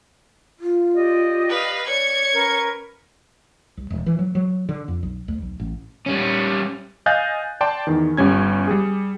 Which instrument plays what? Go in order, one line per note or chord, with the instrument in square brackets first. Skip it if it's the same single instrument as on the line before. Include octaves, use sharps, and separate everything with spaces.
[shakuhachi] F4
[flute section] G4 D5 D#5
[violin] B4 F5
[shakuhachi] C#5 [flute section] D5 [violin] G#6 C#7
[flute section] C#4 A#4 B4
[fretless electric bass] C2
E1
E3
F#3
F#3
D3
F2
B1
D2
B1
A1
[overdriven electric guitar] G3 C#4
[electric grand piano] D#5 F5 G#5 F#6 G6 A6
D5 G5 A5 C6
E2 D#3
G1 G3 C#4 G#6
G3 G#4